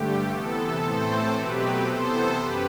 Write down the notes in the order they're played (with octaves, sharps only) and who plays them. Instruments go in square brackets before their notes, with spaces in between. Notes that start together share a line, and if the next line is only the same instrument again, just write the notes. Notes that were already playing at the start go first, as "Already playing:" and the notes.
Already playing: [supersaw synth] G2 D3 A3 G4
C3 E3 B3 A4
A2 E3 A3 C4 A4 C5
B2 F#3 A3 C4 G4 B4
C3 E3 B3 A4 C5
F#2 G4 B4